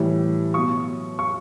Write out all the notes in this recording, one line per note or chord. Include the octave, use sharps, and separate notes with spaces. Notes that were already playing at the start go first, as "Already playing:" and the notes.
Already playing: A2 E3 G3
B2 F#3 C#6 D#6
C#6